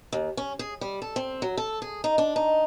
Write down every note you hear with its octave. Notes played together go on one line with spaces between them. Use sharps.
D#2
C#4
G#4
G3
A4
C4
F#3
A4
G#4
D#4
D4
D#4